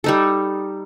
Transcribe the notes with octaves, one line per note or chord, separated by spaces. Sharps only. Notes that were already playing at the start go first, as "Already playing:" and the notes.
G3 D#4 A4